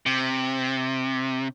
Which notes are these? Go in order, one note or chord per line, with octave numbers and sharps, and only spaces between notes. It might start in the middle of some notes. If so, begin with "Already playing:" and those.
C3